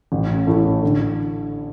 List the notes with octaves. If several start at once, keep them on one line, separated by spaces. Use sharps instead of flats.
A1
A2 E3 A3
D3